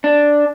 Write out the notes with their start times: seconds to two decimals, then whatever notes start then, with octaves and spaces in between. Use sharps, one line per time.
0.04 D4